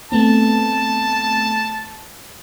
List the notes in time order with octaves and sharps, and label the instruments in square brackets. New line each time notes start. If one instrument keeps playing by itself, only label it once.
[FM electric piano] A3 B3 C4 [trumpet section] A5